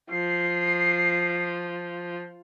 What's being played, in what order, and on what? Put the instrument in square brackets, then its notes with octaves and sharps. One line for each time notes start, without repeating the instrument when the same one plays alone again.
[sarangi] F3 [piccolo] C7